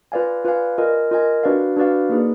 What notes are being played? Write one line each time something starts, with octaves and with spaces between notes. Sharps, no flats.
F4 B4 D5 F5 G#5
F4 B4 D5 F5 G#5
F4 A#4 D#5 G#5
F4 A#4 D#5 G#5
D4 F#4 B4 D5 F5
D4 F#4 B4 D5 F5
A#3 D#4 G#4 B4